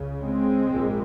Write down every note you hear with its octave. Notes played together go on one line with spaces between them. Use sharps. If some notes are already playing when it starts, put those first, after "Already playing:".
Already playing: C#2 C#3
G#3 C4
A#1 G#2